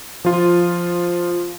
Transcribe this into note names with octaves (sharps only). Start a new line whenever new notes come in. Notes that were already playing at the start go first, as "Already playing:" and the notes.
F3 F4